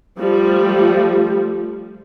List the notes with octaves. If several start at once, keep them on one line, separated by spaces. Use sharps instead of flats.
F3 G3 A3